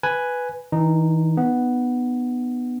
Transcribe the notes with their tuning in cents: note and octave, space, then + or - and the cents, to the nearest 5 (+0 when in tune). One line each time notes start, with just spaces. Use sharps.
B4 +0 G#5 +0
E3 -40 D#4 -15
B3 +0 D#4 -40